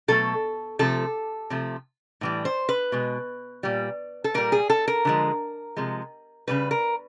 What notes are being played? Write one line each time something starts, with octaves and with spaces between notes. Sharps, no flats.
B2 F#3 A3 A4
C3 F3 A3 A4
C3 F3 A3
A2 E3 G3
C5
B4
B2 G#3
A#2 G3
A4
A#2 G3 A#4
G#4
A4
A#4
D3 F3 G#3
C3 F3 G#3
C#3 E3 G3 B4
A#4